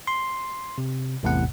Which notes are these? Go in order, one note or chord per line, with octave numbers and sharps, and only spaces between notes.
C6
C3
A1 E2 A2 C3 F#5